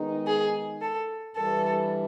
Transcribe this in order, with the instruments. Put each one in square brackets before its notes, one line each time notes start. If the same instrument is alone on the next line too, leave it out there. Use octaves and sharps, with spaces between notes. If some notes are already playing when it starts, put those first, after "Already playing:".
Already playing: [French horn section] D#3 G#3 B3 D#4
[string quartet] G#4
A4
[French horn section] G2 E3 G3 [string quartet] A4